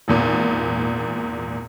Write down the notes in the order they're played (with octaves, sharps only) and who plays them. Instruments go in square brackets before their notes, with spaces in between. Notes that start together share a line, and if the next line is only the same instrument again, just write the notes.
[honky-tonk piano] G#1 E2 A#2